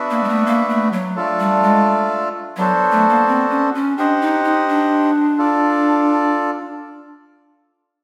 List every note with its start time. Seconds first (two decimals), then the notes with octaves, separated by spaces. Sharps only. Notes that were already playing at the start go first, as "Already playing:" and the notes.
Already playing: B3 D4 F#4 B4 E5
0.11 A#3
0.24 G#3
0.29 A3
0.46 A#3
0.69 A3
0.93 F#3
1.16 A3 D4 F4 A4
1.40 G3
1.63 G#3
2.57 F#3 B3 D4 F#4 A4 C5
2.92 A3
3.09 A#3
3.27 C4
3.50 C#4
3.75 C#4
3.98 D4 G4 C5 D#5 F#5
4.21 D#4
4.44 D#4
4.69 D4
5.38 F4 A4 D5